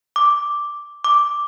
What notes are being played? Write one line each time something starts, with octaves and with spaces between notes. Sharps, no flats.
D6
D6